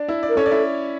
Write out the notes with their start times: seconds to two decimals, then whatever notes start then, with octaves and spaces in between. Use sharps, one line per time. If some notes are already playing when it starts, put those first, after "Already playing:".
Already playing: D4 D5
0.08 E4 E5
0.23 D4 D5
0.29 A#4
0.37 C#4 A4 C#5
0.46 D5
0.51 E4 E5